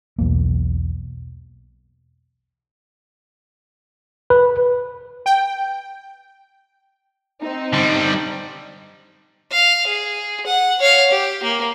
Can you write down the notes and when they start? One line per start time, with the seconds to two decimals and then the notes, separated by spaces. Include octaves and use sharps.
0.19 B1 E2 A#3
4.30 B4
5.26 G5
7.42 C4 D#4
7.73 D3 G3
9.52 F5
9.87 G#4
10.46 F#5
10.80 C#5 F5
11.11 G4
11.43 A#3